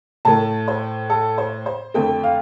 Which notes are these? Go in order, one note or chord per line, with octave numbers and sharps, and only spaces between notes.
A2 A3 A5
C5
A4
C5
C5
F2 D3 A3 G5
F5